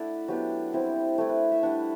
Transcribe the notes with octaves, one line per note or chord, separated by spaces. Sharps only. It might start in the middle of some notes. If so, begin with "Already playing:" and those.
Already playing: A3 D4 E4 D5 E5 F#5
F#3 B3 D4 G4
G3 C4 E4
A3 E4
B4
E5
G3 D4 F#5